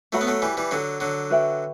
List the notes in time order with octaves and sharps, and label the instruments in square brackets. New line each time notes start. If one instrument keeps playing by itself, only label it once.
[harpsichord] F#3 A3 [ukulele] F#4 B4 F#5 B5
[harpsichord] B3
F#3 A3
E3 G3
E3 G3
[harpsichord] D3 F#3 [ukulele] A4 C#5 F#5
[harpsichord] D3 F#3
[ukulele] F#4 B4 E5 G5